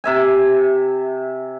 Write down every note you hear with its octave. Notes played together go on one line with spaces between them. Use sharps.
C3 E5 G#5